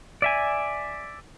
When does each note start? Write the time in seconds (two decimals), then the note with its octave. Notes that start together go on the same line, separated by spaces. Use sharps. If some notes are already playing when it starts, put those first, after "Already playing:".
0.22 D5 E5 G#5